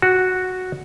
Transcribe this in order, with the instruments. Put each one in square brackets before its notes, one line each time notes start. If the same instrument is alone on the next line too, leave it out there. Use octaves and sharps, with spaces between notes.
[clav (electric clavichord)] F#4